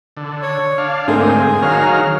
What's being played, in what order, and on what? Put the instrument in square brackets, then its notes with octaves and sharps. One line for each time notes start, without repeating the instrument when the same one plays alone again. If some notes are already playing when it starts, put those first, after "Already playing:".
[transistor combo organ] D3
[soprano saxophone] C#5
[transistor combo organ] D4 F5
[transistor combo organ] G#2 C4 [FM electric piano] D3 A3 A#3 [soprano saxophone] G#4
[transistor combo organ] D#3 F#3 F6 [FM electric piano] C#5 F5 A#5